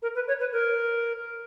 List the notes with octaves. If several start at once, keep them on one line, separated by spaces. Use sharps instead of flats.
A#4
B4
C#5
B4
A#4